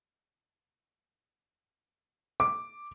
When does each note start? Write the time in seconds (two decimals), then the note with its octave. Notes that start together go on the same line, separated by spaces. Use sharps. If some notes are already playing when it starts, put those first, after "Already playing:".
2.40 D6